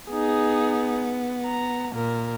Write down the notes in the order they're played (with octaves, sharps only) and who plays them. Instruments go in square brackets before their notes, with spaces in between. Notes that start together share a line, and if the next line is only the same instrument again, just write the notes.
[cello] B3 [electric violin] D#4 G#4
[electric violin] A#5
[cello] A#2 [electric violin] A#4